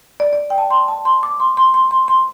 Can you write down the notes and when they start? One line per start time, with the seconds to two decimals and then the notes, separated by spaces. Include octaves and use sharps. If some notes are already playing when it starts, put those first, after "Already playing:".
0.20 D5
0.33 D5
0.50 G5
0.58 A5
0.70 C6
0.88 A5
1.05 C6
1.23 D6
1.40 C6
1.57 C6
1.74 C6
1.91 C6
2.08 C6